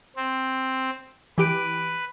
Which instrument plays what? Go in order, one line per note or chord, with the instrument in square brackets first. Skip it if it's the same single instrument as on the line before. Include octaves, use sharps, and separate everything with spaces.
[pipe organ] C4
[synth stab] E3 G4 D7 [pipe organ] B4